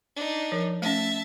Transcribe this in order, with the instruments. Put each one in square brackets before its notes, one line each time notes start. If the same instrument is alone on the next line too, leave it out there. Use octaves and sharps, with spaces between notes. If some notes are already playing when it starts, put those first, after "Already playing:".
[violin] D4 D#4
[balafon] F3 A#4
[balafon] A3 C#4 [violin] E5 A5